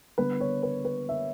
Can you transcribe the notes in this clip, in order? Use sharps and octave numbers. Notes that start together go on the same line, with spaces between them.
D3 G3 B3 B4
C#5
B4
B4
E5